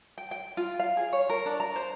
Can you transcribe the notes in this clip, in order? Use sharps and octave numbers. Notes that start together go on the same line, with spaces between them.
G5
G5
F4
F5
G#4
C#5
A#4
D4
A#5
C5